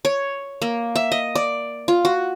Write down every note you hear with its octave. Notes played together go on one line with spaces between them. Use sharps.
C#5
A#3
E5
D#5
D5
F4
F#4